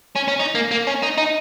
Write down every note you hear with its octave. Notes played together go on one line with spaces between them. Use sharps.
C#4
C#4
D#4
A#3
A#3
C#4
D#4
D#4